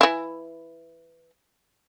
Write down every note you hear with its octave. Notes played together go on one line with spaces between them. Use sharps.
E3 E4